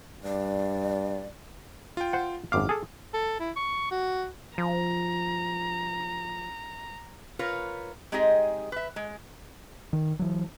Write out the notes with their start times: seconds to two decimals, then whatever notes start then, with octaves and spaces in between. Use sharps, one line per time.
0.24 G2 D5
1.97 F4 G5
2.13 C5 F#5
2.52 G#1 F#2 F5 D6 F6
2.69 G#4 A4
3.14 A4
3.40 E4
3.56 C#6
3.91 F#4
4.58 F3 A#5
7.39 F4 A#4 B4 C#5
8.12 G#3 C4 D#4 G4 G#4 D#5
8.72 B4 E5
8.96 G#3
9.93 D#3
10.19 E3 F#3